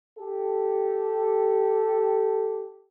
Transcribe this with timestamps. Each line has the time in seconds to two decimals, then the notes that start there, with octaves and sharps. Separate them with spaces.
0.19 G4 A4